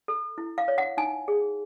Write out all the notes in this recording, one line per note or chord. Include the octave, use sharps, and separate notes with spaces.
A4
E4
F5
C#5
F#5
D#4 G#5
G#4